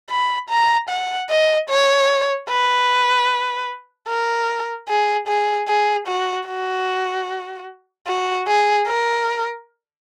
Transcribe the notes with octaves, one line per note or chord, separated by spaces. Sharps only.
B5
A#5
F#5
D#5
C#5
B4
A#4
G#4
G#4
G#4
F#4
F#4
F#4
G#4
A#4